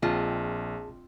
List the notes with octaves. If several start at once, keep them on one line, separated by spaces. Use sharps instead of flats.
A#1 C4 F4 G#4 D#5 A5